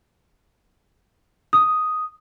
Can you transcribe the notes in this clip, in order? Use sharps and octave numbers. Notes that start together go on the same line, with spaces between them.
D#6